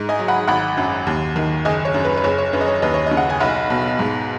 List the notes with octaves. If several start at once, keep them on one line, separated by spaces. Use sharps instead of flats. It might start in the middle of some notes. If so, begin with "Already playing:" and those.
Already playing: G#2
D#5 G#5
F#3
F#5 B5
G#1 F#5 B5
F#2
D#2
D#3
F#1 D#5 G#5
C#5
F#2
B4
B4
F#1 C#5
C#5
F#2 B4
D#5
C#5
D#2 B4 D#5
C#5
D#5
C#3
F#5
G#5
B1 F#5 B5
B2
G#2